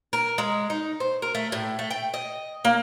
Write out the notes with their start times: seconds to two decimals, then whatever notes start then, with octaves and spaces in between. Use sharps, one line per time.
0.13 A#4
0.38 G#3
0.70 D#4
1.00 C5
1.22 A#4
1.35 A3
1.52 A2
1.79 A3
1.91 G5
2.14 D#5
2.65 A#3